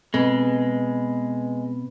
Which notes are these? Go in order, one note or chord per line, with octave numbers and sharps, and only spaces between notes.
B2 G#3 C4